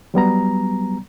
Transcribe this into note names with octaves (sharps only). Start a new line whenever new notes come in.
F#3 G3 B3 A#5